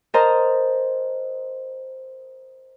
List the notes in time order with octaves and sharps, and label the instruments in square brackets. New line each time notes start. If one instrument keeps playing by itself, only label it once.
[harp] A#4 C5 D#5 A5 A#5